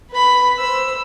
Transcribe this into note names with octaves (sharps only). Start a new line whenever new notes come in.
B4 B5
C5 E6